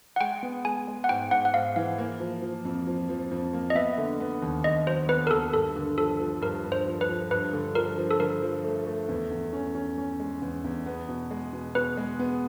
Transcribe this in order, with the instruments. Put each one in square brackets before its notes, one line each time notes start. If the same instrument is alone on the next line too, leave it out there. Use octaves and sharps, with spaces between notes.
[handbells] F#5
[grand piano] G#3 [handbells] G5
[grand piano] B3
[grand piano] G#3 [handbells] G#5
[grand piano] G#3
[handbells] F#5
[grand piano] G#2 [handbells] G5
[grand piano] G#2 [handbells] F#5
[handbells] F#5
[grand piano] G#2 [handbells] F5
[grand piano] E3 [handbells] F5
[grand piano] A#3
F3
F3
F2
F3
F3
F2
A#3
[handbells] D#5
[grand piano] B3 [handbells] E5
[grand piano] D3
B3
D#2
[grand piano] D#2 [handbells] D#5
[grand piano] F#3 [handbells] C5
[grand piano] B3 [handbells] B4
[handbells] A#4
[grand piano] D#2 [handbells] A4
[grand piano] G2 [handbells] A4
[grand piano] D3
[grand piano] F3 [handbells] A4
[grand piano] F3
[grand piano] G2 [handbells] A#4
[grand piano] G2
[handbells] C5
[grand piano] F3
[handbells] B4
[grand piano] F3
[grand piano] G2 [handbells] B4
[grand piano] D3
[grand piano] F3 [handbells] A#4
[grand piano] F3
[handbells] A4
[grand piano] D3 [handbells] A#4
[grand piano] F3
A3
A3
E2
E2
C#4
C#4
C#4
G#3
E2
E2
B3
B2
G#3
B2
[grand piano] B2 [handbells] B4
[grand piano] G#3
B3